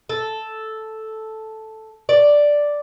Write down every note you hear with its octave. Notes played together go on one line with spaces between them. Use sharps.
A4
D5